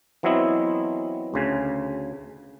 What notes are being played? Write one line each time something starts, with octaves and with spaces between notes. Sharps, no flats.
E3 F#3 B3 C4 E4 D#5
D2 C#3 G#5